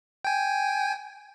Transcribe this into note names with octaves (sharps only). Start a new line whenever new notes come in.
G5 G#5